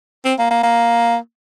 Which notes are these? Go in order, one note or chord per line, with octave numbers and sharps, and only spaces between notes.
C4
A#3
A#3
A#3